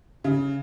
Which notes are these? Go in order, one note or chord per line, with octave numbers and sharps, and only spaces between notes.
C#3